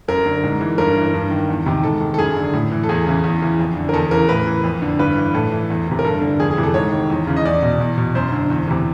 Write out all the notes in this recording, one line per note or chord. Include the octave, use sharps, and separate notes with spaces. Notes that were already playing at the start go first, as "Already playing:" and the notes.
F#2 A#4
D3
G#2
E3
G2 A#4
E3
G2
D#3
E2
C3 D#3
G#2 A4
D#3
A4
F#2 G#4
D3
A2
E3
A4
E2 G#4
C#3 E3
E2
C#3 E3
F2
D3
A#4
E2 A4
C#3 E3 A#4
A2 B4
E3
F2
D3
G2 B4
E3
A2 A4
E3
E2
C3 E3
A#4
G2 A4
D3
F2 G#4
G#4
C3 E3
A4
G#2 C#5
D#3
E2
C#3 E3
D#5
E2 D5
B2
E2
B2
F#2 C5
D3
E2
C3 E3